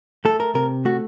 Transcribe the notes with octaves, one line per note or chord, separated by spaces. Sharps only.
A3 A4
A#4
C3 A#4
A3 F#4